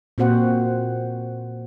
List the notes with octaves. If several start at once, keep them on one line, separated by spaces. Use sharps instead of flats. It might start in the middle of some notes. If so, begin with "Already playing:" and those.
A#2 C4 F#4 C5 F#5